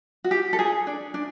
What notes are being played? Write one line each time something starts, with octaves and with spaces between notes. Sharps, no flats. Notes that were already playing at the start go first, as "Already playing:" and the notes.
F#4
G4
A4
G#4
D4
D4